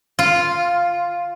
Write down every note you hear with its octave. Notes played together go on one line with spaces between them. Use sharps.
F4